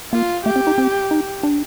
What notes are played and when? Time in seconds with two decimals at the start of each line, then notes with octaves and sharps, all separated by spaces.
0.12 A#3 F4
0.45 A3 G4
0.56 C4
0.67 D#4
0.78 C4
1.11 D#4
1.43 D4